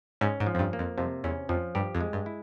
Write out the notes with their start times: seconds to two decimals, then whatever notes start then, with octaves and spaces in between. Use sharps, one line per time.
0.21 G#2 C#4
0.40 G#2
0.46 F3
0.55 F2
0.59 G2
0.73 A#3
0.79 F2
0.98 F2 C3
1.24 E2 C#4
1.49 F2 F3
1.75 G2 G4
1.95 F2
2.01 G#3
2.13 G2
2.26 E4